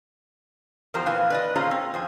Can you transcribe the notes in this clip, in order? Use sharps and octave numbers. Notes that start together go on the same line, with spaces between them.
E2 F3 G4 A#4 C5 A#5
A#2 E3 C4 B4 F5 G#5
B4 D5 D#5
A#2 C#4 F4 G#4 C5 A#5
C4
F2 C5 G#5